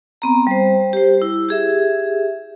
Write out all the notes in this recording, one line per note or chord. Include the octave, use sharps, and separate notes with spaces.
B3 C4 A#5
G3 C5
G4 C5
E4
G4 G#4 E5